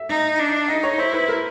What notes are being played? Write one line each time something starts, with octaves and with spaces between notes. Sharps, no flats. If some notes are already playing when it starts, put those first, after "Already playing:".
Already playing: E5
D#4
D4
D#4 D#5
C#5
E4 C5
B4
A#4